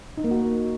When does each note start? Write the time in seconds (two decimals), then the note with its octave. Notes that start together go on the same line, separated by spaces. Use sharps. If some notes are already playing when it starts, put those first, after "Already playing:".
0.17 D#4
0.24 A#3
0.31 F#4